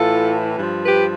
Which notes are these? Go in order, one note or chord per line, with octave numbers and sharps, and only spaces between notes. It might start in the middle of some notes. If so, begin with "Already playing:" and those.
Already playing: A2 E3 F4 A4
G2 F3
G4 B4